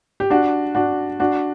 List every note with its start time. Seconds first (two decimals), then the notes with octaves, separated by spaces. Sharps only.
0.20 G4
0.30 D4 F#4
0.75 D4 F#4
1.20 D4 F#4